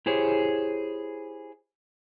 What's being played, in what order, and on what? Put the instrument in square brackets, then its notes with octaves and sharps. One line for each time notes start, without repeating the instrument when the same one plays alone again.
[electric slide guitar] E4 G4 G#4 C5 C#5